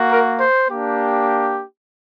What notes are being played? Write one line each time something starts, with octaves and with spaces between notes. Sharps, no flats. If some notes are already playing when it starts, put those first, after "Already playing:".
Already playing: A#3 F#4
A#4
C5
A#3 D4 G4